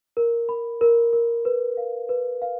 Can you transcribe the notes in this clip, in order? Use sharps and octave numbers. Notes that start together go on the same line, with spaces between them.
A#4
B5
A#4
A#4
B4
F5
B4
F5